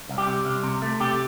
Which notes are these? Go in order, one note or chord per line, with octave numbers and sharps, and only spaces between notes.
C2
G4
C3
C2
C3
A3
C3 G4